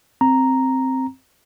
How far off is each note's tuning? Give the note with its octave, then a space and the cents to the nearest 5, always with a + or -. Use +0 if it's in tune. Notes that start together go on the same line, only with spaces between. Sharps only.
C4 +0 A#5 +0